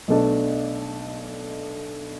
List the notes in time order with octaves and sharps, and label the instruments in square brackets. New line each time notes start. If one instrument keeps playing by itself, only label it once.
[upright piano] B1 B2 A3 D4 A4